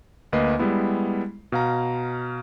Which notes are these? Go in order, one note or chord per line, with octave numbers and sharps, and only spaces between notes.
D2 A#3 B4 D#5 C7
G3 G#3 B3 E4
B2 F5 A#5